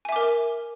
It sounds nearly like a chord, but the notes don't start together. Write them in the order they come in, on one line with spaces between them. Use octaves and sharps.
G#5 E5 D6 A#4